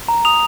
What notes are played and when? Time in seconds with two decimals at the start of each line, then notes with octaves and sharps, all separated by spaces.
0.08 A#5
0.25 D#6 F7